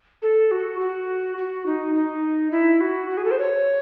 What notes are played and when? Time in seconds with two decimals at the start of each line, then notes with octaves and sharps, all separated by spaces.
0.22 A4
0.51 F#4
0.80 F#4
1.38 F#4
1.66 D#4
1.95 D#4
2.51 E4
2.81 F#4
3.10 F#4
3.17 G#4
3.25 A4
3.31 C5
3.39 C#5